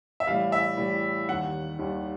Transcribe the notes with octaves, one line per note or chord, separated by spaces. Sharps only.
E5
A2 E3 G3 F5
E5
A2 E3 G3
D#2 D#3 G3 F#5
D#2 D#3 G3